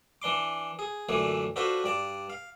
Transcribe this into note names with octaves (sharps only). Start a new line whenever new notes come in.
E3 D4 C6 D6
G#4
F#2 A#2 D3 E3 A3 D4
D4 F4 F#4 A4 B4 C5
G2 D5 A5
F5